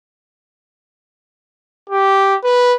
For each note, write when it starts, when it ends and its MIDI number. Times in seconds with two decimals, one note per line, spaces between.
1.90 2.36 67
2.45 2.75 71